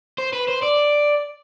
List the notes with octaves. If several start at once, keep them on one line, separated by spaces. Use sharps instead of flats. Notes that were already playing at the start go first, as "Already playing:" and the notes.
C5
B4
C5
D5